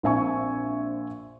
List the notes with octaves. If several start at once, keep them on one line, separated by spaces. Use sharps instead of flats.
A#1 C4 E5 G#5 C#6